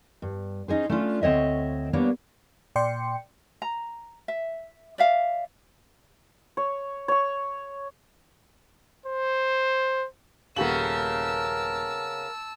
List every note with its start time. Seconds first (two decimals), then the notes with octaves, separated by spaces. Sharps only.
0.22 G2
0.68 C#4 D#4 G#4 C5
0.89 A3 C#4 D4 F4
1.22 D2 C4 C#5 D#5 E5
1.93 G3 A#3 B3 D4 C#5 D5
2.76 A#2 D5 G5 C6 C#7
3.62 A#5
4.28 E5
4.98 D5 E5 F5
6.57 C#5
7.08 C#5 C#6
9.06 C5
10.56 D#1 C#3 B3 G4 A#4 A5 E6 F#7